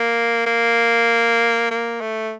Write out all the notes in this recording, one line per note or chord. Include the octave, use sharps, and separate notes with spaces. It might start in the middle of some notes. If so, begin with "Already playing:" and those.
Already playing: A#3
A#3
A#3
A3